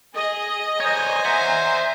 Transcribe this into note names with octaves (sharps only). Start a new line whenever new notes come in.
G#4 D#5
C5 C#5 G#5 A#5
C5 E5 F#5